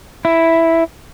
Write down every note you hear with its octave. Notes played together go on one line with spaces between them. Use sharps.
E4